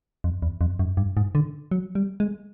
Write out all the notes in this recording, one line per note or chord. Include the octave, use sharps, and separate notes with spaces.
F2
E2
F2
F#2
G2
G#2
D3
F#3
G3
G#3